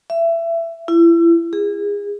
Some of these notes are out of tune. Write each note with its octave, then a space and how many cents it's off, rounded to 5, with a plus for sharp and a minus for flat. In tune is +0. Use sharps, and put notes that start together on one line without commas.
E5 +25
E4 +30
G#4 -30